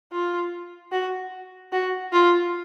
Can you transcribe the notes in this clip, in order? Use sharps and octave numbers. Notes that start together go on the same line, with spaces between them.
F4
F#4
F#4
F4